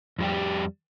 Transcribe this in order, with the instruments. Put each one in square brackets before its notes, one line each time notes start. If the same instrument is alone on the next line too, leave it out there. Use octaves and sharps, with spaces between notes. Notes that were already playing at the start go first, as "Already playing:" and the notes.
[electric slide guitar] F2 G3 G4